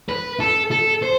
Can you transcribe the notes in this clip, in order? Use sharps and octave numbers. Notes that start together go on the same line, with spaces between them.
B4
A4
A4
C5